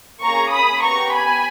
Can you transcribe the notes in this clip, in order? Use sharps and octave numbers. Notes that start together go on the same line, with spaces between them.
A#3 C#4 G#4 A#5 C#6
B5 D#6
B3 G4 A#5 C#6
G#5 B5